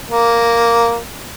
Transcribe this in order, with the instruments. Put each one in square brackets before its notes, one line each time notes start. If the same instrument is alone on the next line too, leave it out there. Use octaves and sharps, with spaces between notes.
[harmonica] A#3